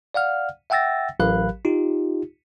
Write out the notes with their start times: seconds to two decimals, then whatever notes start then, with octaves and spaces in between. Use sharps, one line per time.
0.14 D5 F5 F#5 F6
0.70 E5 F#5 G5 E6 A6 A#6
1.20 A1 F#3 A#4 F5 B5 F#6
1.65 D#4 F4 G4